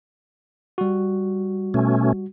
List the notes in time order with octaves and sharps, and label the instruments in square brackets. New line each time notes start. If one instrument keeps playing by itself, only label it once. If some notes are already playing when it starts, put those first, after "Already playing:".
[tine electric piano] G3 F#4
[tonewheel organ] B2 A3 C#4